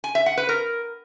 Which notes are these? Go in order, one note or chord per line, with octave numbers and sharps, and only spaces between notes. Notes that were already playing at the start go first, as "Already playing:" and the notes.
G#5
E5
F#5
B4
A#4